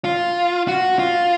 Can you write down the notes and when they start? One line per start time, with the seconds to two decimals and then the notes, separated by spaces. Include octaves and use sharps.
0.05 F4
0.68 F#4
0.99 F4